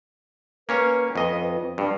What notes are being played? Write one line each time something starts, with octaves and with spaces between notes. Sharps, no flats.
A#3 C#4 B4 C#5
F2 D#5
G2